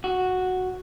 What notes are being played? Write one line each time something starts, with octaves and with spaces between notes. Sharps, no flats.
F#4